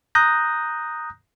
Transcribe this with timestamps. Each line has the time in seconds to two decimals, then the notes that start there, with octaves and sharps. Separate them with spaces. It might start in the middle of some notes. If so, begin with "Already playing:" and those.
0.15 A#5 D#6 F#6 G6 A#6